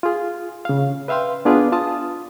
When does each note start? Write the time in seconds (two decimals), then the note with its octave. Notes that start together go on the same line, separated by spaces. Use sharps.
0.03 F4 G#4
0.65 C#3 F5
1.08 B4 E5 F5 G5 C6
1.45 B3 D4 F4 G#4 B4 D5
1.72 F4 A5 D#6